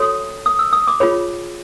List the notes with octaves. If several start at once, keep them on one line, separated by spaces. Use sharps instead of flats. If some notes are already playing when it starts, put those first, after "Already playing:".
Already playing: F#4 A4 C#5 D#6
D#6
E6
D#6
D6
F4 G#4 C#5 B5